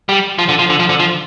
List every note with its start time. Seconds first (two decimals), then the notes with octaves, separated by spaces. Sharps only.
0.09 G3
0.39 F3
0.49 D3
0.59 F3
0.70 D3
0.79 F3
0.89 D3
1.00 F3